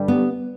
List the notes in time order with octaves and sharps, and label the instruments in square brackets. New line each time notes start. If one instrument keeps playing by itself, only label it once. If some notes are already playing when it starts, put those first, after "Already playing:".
Already playing: [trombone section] G2 D3 G3
[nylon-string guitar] B3